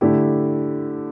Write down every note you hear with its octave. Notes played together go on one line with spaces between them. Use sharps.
D3 A3 E4 G4